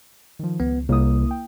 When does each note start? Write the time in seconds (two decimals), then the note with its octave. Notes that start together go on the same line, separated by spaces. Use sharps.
0.39 D#3 F3
0.60 C#2 B3
0.89 C2 A#3 E4 D#6
1.31 G5